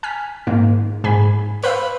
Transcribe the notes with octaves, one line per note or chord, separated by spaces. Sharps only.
G#5 F6 B6
G#2 D#3 A#3
G#2 G#5 B5
B4 C5 F5 E6